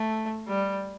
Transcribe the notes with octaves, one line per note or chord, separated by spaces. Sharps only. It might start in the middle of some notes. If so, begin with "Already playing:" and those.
Already playing: A3
G3